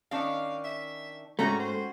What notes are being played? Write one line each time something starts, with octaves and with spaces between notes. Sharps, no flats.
D#3 C#4 D4 F5
E5
G#2 G3 A3 C#4 F#4 A#5
C5